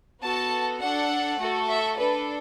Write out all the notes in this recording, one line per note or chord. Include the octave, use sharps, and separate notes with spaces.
B3 F#4 A4 A5
D4 A4 F#5
A3 F#4 A4
E5
D4 A4 B4